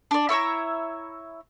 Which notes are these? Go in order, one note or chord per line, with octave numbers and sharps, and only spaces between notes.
D4 D5
E4 C#5 E5 A#5